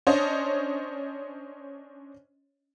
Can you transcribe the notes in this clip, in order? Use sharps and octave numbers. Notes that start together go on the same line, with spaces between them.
C#4 D4 C5 C#5 D#5